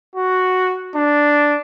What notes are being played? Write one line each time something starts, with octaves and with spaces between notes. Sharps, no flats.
F#4
D4